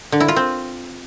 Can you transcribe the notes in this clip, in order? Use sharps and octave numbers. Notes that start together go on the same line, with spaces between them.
D3
E4
F4
C4